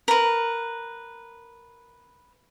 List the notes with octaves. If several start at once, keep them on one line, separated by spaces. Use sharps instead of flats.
A#4 B4